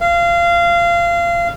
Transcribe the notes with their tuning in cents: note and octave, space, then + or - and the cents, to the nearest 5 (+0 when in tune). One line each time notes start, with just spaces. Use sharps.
F5 -25